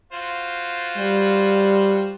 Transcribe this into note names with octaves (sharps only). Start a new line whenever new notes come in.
F4 F#4 C5
G3